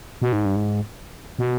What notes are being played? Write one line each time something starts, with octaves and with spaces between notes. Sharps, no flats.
B2
G#2
G2
G#2
B2